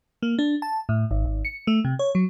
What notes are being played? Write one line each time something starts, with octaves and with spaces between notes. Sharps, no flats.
A#3
D4
A5
A2
G#1
G#1
C#7
A3
C3
C#5
F#3